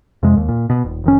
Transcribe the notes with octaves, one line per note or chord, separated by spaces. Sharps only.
F2 C3 G#3
D#2
A#2
B2
D#1
F1 D#3 C#4